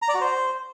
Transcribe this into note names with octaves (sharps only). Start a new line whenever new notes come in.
A#5
D5
F#4
C5